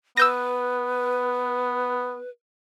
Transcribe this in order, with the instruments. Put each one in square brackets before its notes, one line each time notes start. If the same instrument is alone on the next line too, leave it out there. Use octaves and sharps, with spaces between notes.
[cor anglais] B3 [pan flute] B4 [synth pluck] E6 G6 A#6